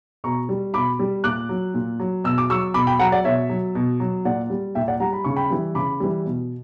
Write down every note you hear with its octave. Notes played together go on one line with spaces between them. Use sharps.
B2 A#5 C#6
G3
B2 B5 D6
G3
A#2 D6 F#6
F#3
A#2
F#3
B2 E6
D6
F#3 C#6 E6
B2 B5 D6
G5 B5
F#3 F#5 A#5
D5 F#5
B2 C#5 E5
F#3
B2
F#3
A#2 D5 F#5
G3
A#2 E5 G5
D5 F#5
G3 F#5 A#5
B5
C#3 C#6
G5 B5
E3 G3
C#3 B5 D6
E3 G3
B2